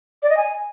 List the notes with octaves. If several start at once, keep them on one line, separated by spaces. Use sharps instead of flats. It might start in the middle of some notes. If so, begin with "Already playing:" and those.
D5
D#5
G#5